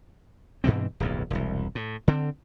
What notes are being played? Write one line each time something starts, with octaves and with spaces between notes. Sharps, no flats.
G2 B2 E3 C4
D1 B1 F2
E1 C2
A2
D3 C4